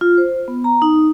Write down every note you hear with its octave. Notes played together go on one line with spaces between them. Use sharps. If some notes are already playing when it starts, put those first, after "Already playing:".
F4
C5
B3
A#5
D#4